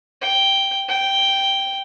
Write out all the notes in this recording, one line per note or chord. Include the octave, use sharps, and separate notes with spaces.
G5
G5